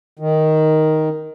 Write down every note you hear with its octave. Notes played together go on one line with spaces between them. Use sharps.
D#3